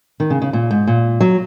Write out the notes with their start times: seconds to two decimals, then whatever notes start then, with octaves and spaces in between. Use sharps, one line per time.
0.20 D#3
0.30 C#3
0.42 C#3
0.53 A#2
0.71 G#2
0.87 A#2
1.20 F#3